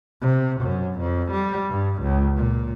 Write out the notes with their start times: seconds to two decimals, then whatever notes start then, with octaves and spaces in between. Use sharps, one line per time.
0.21 C3
0.60 F#2
0.99 F2
1.31 G3
1.70 G2
2.02 C#2
2.36 A#2